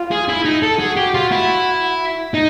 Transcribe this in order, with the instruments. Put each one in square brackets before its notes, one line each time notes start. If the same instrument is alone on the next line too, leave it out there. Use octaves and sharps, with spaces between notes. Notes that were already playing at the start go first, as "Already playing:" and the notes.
Already playing: [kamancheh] F4
[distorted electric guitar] G#4
E4
D#4
A4
[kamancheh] F#4 [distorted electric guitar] G#4
[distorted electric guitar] G4
F4
E4
D#4